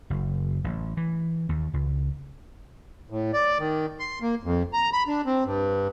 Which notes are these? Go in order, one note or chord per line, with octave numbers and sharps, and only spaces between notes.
F#1
A1
E3
D#2
C#2
A2
D5
D#3
C6
A#3
F2
A#5
B5
D4
C4
G2